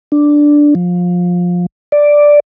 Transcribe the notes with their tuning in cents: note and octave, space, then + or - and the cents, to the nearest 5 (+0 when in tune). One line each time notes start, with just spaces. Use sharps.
D4 +0
F3 +20
D5 +0